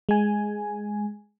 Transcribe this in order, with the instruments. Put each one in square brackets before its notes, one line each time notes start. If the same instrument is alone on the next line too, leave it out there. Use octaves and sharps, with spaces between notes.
[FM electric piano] G#3 G#5